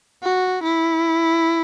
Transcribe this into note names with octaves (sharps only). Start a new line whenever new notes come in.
F#4
E4